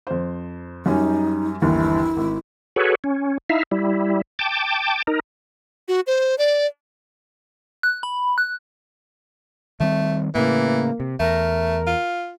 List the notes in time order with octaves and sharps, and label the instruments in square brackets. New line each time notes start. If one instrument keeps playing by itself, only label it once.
[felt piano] F2 C5
[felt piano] F#2 G3 C#4 [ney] D#4
[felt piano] G1 D#2 E3 [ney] E4
[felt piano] G#1
[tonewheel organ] F#4 G#4 A4 B4 C#5
C#4
D#4 E4 E5 F5
G3 E4
G5 A5 D6
D#4 A#4
[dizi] F#4
C5
D5
[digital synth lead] F#6
B5
F#6
[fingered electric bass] D#3 G3 C4 [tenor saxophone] A3
[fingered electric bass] A2 C#3 [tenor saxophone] E3 [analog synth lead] A#3
[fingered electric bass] C3
[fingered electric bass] E2 [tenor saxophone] A3 [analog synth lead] A#4
[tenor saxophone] F4